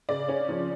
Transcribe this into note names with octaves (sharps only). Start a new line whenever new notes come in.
C#3 D5
C#4
F3